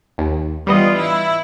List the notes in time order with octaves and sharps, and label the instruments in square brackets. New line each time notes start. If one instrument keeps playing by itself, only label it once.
[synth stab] D#2
[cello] E3 F4 [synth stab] G3 B3 D#5
[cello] E4